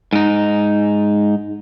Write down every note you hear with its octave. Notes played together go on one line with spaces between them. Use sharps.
G#2 D#4